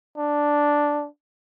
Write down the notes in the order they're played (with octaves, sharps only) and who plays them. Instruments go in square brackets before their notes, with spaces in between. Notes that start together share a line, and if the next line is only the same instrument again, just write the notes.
[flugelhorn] D4